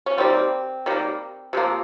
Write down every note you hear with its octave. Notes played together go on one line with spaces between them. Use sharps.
C#4
D#3 G3 A#3 C4
D#3 G3 A#3
C3 F3 A#3